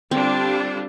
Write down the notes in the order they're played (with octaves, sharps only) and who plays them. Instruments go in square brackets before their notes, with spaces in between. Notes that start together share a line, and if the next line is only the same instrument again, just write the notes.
[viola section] D3 G3 D4 F4 [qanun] C4